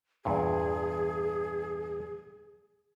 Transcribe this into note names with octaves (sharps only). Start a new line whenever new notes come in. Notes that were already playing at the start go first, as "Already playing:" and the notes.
E2 G2 A#2 G#4